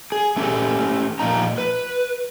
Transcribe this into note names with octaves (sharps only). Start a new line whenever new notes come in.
G#4
A3 C#4 D#4 G4 A4
A#2 F3 D#4 A#5
B4